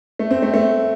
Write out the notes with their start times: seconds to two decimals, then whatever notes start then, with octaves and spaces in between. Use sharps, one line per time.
0.19 A3
0.31 C4
0.42 A3
0.54 A3